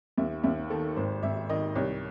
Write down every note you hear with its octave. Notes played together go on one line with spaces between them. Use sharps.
D#2 E5
D#2 E5
D#3 A4
G#1 C5
G#1 E5
D#3 D#5
C2 C#5